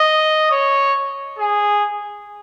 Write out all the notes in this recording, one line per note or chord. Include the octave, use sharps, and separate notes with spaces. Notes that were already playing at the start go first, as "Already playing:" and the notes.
Already playing: D#5
C#5
G#4